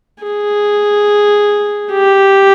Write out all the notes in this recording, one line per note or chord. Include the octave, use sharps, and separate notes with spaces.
G#4
G4